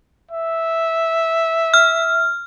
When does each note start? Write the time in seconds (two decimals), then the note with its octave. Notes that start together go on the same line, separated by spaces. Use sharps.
0.31 E5
1.74 F6